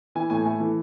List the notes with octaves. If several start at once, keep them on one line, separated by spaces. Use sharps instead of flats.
E3 G#5
A2 G#5
A3 G#5
E3